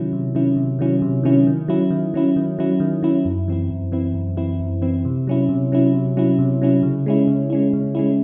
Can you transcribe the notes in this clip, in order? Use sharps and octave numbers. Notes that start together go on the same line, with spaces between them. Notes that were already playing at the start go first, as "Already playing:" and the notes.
Already playing: C3 D#3 F#3 C#4 E4
C3
D#3 F#3 C#4 E4
C3
D#3 F#3 C#4 E4
C3
D#3 F#3 C#4 E4
D#3
F#3 C#4 E4
D#3
F#3 C#4 E4
D#3
F#3 C#4 E4
D#3
F#3 C#4 E4
F#2
E3 C4 E4
F#2
E3 C4 E4
F#2
E3 C4 E4
F#2
E3 C4 E4
C3
F#3 C#4 E4
C3
F#3 C#4 E4
C3
F#3 C#4 E4
C3
F#3 C#4 E4
C#3
G#3 C#4 E4
C#3
G#3 C#4 E4
C#3
G#3 C#4 E4